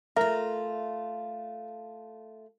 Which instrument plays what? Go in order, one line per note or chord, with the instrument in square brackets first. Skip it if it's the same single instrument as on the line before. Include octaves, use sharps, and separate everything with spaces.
[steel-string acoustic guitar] A3 F4 [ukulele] A#4 [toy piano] E5